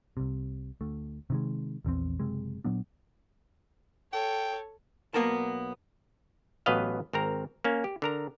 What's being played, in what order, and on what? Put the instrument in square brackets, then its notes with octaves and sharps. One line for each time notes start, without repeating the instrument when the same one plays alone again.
[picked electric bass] C2 C3
D2 A3
C3 D#3 G#3
A#1 E2 E3 C4
F#1 C3 G#3
A#2 F#3 B3 D4
[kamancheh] A4 C#5 [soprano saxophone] G5
[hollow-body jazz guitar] B1 G#3 A#3 B3 A#4 A5
[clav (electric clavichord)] A1 F#3 B3 B4 D#5 F5
G#1 C4 A#4 A#5
A#3 C#4
G4
D3 A#4 A#5